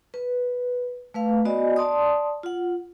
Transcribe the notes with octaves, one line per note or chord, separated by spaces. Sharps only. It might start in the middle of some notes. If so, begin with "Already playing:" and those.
B4
A3 B4 F5
B3 F#4 D5 D#5 G#5
D5 A5 C6 D#6
F4 F#5